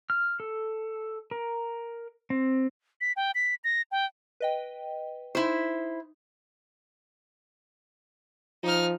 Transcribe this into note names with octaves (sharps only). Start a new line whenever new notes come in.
F6
A4
A#4
C4
B6
G5
B6
A#6
G5
B4 D#5 G5
D#4 E4 C5
F3 D#4 F6